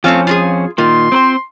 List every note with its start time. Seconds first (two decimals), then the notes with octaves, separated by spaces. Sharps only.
0.04 F2 F3 A3 C4 C#4 F4
0.27 F4 F#4 G#4
0.78 A#2 D#3 F4 C6
1.12 C4 B4 C5